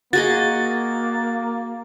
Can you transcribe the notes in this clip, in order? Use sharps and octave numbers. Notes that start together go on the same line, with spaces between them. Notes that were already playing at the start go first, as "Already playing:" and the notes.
A#3 F#4 G#4 D#5 A6